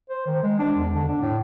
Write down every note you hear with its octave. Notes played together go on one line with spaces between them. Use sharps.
C5
D#3
G#3
D4
E2
D3
D4
A2